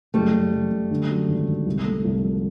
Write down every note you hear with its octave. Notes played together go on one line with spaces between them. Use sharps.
F#1 G3 A3
F#1
F#1
F#1
D3
F#2
G#1
G#1
C2
A3
C2
F3